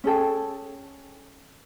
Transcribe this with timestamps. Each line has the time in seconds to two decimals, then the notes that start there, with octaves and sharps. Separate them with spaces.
0.04 C#4 G#4 A4 G5